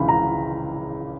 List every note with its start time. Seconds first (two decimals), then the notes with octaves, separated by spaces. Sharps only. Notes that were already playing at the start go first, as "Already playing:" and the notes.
Already playing: C#2 C#3 E3 B5 C6
0.09 A#5